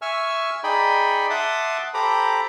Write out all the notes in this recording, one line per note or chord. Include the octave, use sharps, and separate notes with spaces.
E5 G#5 C#6 E6 F6
D#4 G#4 D5 G5 B5
E5 F#5 A5 C6 D6 D#6
G4 A4 C5 A#5 B5 D6